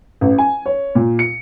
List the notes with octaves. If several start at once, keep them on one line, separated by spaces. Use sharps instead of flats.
A1
G#5
C#5
A#2
C#7